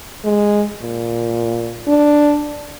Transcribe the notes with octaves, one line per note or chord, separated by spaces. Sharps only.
G#3
A#2
D4